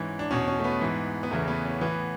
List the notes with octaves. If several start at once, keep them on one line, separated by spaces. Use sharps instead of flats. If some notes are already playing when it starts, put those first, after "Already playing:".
Already playing: G#2 E3 C#4
D4
E2 B2 C#4
C#4
A3
B3
G#2 E3
B3
E2 C#3 E3 A3
B3
C#4
A2 E3 B3